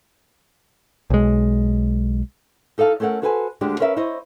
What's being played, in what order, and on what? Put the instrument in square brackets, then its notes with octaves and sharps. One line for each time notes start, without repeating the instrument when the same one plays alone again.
[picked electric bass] B1 G#3
[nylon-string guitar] D#4 A4 D5 F5 A5
A3 C#4 A4 A#4 F#5
F#4 A4 B4 C5 G5 G#5
D2 G3 G#3 D4 G4
C#4 A#4 B4 E5 F5
E4 C5 C#5 D#5